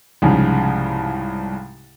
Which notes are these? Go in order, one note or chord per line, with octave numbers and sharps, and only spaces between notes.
C2 G#2 C#3 F3